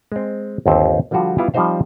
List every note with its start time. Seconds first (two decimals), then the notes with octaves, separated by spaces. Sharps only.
0.12 G#3 C4
0.66 G1 D#2 C4 C5
1.11 D3 F3 G3 F4 F#4
1.38 G3 B3 E4 F4
1.54 F3 G3 C4 D#4 C5 F5